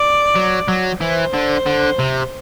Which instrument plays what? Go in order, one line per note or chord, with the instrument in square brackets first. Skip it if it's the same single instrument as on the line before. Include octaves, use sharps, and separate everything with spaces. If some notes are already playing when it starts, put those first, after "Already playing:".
Already playing: [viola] D5
[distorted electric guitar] F#3
F#3
[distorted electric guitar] E3 [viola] C5
[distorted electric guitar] D3
D3
C3